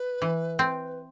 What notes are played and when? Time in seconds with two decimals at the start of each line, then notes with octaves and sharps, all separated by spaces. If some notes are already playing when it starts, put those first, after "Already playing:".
Already playing: B4
0.22 E3
0.59 C4